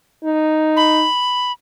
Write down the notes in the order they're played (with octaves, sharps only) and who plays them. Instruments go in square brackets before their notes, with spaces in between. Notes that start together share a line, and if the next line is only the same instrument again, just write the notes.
[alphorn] D#4
[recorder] B5